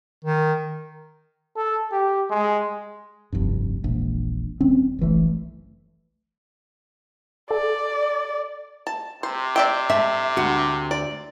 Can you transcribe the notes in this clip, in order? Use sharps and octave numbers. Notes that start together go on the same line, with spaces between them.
D#3
A4
G4
G#3
F1 C2 G2
E1 A#1
D#1 D#3 C4 C#4
F#1 B1 E3 A3
A4 D5
A5
C3 C5
D5 E5 G5
A3 E5
D2 F#4
D5